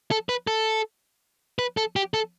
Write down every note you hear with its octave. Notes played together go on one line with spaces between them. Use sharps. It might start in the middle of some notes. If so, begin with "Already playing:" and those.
A4
B4
A4
B4
A4
G4
A4